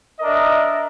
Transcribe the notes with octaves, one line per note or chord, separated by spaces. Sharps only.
D4 A#4 D#5 E5